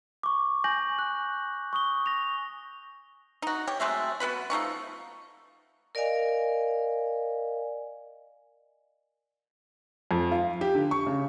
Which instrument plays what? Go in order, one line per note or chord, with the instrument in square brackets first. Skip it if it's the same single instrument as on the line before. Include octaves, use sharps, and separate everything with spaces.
[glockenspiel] C#6 D6
G#5 G6 A#6 F#7
F#6
C#6 D#6 G7
A#6 F7
[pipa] D#4 F#4
G4 C#5
F#3 G#3 A3 C4
B3 F#4 B4 B5
F3 A3 D#4 C#6
[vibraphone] A#4 D5 D#5 F5 G#5
[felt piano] F2
F4
G4
D3
C#6
C#3